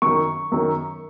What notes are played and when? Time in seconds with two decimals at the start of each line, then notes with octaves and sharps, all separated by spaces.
0.02 F#2 D#3 C#6
0.52 F#2 D#3